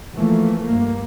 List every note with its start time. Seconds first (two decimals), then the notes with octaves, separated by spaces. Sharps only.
0.15 E3 F3 A3 A#3
0.66 G2 A#3